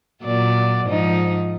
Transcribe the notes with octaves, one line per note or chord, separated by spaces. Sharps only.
A#2 F#3 D5
G#2 F3 D#4